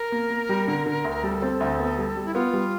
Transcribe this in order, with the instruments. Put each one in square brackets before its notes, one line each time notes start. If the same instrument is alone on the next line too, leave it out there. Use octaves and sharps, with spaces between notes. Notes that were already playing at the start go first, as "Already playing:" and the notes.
Already playing: [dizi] A#4
[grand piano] A#3
A#3
G3
D3
D3
D2
[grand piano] G3 [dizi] A4
[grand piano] C4
D2
B3
G3
G3
[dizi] E4
[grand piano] B3 [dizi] F4
[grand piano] G3